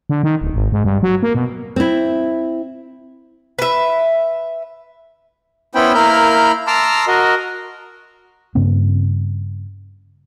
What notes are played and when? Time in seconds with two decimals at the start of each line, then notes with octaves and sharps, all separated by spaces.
0.09 D3
0.23 D#3
0.41 D1
0.54 G#1
0.72 G#2
0.84 G2
1.03 F#3
1.23 A#3
1.35 B2
1.76 C4 E4
3.59 B4 E5
5.75 B3 C#4 E4 C5 G5 B5
5.94 A#3 E4 A#4 B5 F6 G6
6.67 A5 A#5 C6 D6 E6 F6
7.07 F#4 A#4 D#5
8.55 G2 C#3 A#3 C4